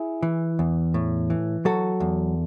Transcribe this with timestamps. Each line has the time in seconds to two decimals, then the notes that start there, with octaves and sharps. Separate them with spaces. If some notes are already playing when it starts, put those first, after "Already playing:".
Already playing: E4 G#4
0.23 E3
0.59 E2
0.94 A2
1.30 E3
1.65 F#3 F#4 A4
2.00 E2